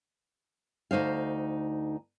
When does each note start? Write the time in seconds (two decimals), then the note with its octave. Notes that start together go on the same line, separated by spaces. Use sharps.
0.91 D2 D#4 C5 F5